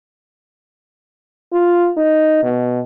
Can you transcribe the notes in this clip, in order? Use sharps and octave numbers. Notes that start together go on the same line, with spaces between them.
F4
D#4
B2